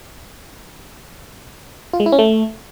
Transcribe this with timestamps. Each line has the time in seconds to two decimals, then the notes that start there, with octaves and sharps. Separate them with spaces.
1.93 F4
2.00 G#3
2.06 E4
2.12 C#4
2.19 A3